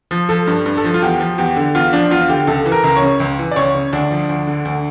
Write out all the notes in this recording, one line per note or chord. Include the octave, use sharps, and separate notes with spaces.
F3
F3 A4
G2
G2
A4
F3
F4
E2 G4
F3
E2 G4
D3
E2 F4
F3 D4
E2 F4
D3 G4
C#2 A4
E3
A#4
C#2 A#4
C#5
C#3
C#2
E3
D5
C#2 C#5
C#3
D2 D4
F3
D2
D3
D2